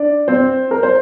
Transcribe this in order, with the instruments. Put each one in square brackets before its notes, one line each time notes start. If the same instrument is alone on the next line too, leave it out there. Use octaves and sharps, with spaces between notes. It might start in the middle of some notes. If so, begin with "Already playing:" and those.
Already playing: [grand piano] D4 D5
C4 C5
A#4
C5